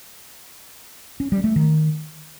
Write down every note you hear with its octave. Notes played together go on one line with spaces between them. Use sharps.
C#4
G3
A3
D#3